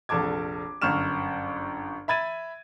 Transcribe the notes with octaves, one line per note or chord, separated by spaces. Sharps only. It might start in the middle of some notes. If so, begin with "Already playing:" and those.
F1 A#1 A4 A5 D6 G#6
G1 F#2 C#6 F6 E7
E5 B5 G#6 A6 D#7